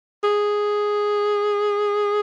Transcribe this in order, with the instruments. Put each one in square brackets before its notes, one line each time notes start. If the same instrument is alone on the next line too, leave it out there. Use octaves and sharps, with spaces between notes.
[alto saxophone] G#4